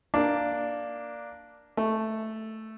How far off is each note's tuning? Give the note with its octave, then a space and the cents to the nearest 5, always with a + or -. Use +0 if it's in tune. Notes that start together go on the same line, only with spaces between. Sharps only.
A#3 +0 D4 +0
A3 +0 A4 +0